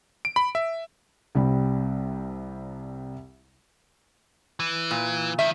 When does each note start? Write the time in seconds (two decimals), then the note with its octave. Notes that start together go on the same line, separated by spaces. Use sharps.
0.25 D7
0.36 B5
0.55 E5
1.35 C2 C3 G3
4.60 E3
4.91 A#2
5.39 D#3 F3 E5